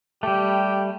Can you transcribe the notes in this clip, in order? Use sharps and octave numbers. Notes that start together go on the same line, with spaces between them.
G3 A3 G4